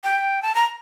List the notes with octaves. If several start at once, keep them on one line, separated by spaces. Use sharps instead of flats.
G5
A5
A#5